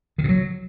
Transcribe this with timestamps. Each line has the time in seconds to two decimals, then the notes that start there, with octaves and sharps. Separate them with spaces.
0.18 D#3
0.24 C3
0.29 F#3